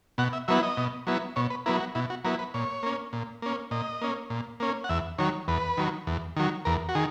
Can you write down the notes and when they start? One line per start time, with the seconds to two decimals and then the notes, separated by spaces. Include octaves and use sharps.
0.18 B2 F#5
0.33 E5
0.48 F#3 B3 E4 E5
0.63 D#5
0.77 B2
1.07 F#3 B3 E4
1.36 B2 C#5
1.50 B4
1.66 F#3 B3 E4 A#4
1.80 F#4
1.95 B2 E4
2.10 F#4
2.25 F#3 B3 E4 A#4
2.39 B4
2.54 A#2 C#5
2.83 A#3 C#4
3.13 A#2
3.42 A#3 C#4
3.71 A#2 D#5
4.02 A#3 C#4
4.30 A#2
4.60 A#3 C#4
4.84 F#5
4.89 E2 E5
5.19 D#3 F#3 C#5
5.48 E2 B4
5.77 D#3 F#3
6.07 E2
6.37 D#3 F#3
6.65 E2 A#4
6.89 F#4
6.95 D#3 G#4